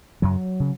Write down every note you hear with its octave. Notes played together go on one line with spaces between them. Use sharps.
F#2 C#3 F#3
C#3